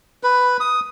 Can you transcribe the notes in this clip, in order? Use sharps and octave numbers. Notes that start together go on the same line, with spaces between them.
B4
D#6